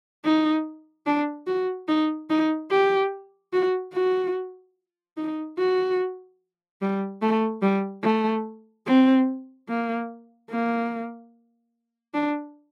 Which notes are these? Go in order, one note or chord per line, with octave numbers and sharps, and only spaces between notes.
D#4
D4
F#4
D#4
D#4
G4
F#4
F#4
D#4
F#4
G3
A3
G3
A3
C4
A#3
A#3
D4